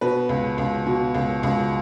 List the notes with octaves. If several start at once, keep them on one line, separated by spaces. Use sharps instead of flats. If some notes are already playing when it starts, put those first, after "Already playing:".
B2 B4
C#2
C#2
B2
C#2
C#2